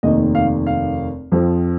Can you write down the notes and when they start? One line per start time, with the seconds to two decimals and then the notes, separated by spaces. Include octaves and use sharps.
0.03 F1 D#2 D#3 D#5
0.35 F5
0.67 F5
1.32 F2 F3 C4